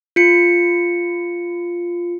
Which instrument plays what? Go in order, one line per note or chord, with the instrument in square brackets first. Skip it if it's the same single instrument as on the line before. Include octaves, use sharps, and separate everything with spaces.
[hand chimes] F4 C#7